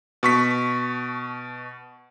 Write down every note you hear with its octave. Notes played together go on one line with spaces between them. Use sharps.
B2 C#6 B6